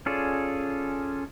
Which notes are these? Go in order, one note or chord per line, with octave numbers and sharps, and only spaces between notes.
C#4 F4 G#4 A4 D5